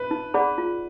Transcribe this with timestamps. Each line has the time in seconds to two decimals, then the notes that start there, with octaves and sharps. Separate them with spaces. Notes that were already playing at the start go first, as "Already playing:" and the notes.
Already playing: B4
0.11 D#4
0.34 G#4 D5 F#5 B5
0.58 F4